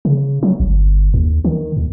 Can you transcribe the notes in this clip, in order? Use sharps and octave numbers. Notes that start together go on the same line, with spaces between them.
C#3
F#3
G1
D#2
D#3
D#2